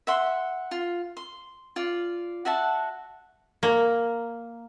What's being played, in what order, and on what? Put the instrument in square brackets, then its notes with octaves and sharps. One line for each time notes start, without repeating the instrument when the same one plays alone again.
[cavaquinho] E5 F#5 C6
F4
C6
F4 D5
F#4 E5 F#5 A5
[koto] A#3